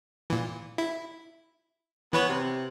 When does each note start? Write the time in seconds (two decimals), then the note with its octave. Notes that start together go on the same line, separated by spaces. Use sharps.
0.30 A#2 E3
0.78 E4
2.13 E3 B3 B4 C#5
2.29 C3